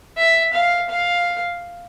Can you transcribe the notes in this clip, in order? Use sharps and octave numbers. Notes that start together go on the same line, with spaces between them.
E5
F5
F5